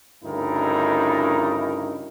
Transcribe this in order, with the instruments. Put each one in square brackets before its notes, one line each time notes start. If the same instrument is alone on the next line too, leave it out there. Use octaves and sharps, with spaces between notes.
[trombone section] D2 G2 C#3 D#4 E4 A#4